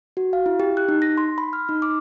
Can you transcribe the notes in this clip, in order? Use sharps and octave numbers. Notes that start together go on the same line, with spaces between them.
F#4
F5
E4
G4
F#6
D#4
A#6
C6
B5
F6
D#4
D6